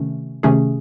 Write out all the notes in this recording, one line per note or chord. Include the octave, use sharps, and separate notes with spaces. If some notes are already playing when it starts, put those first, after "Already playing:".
Already playing: C3 D#3 A3 C#4
C3 D#3 A3 C#4 G#4